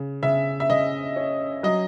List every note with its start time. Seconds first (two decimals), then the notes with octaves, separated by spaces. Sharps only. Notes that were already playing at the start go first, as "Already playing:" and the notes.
Already playing: C#3
0.23 C#3 E5
0.60 E5
0.70 C#3 D#5
1.16 C#4
1.63 F#3 D#5